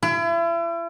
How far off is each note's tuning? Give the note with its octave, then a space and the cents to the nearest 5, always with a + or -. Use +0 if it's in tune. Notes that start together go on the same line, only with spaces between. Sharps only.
E4 +40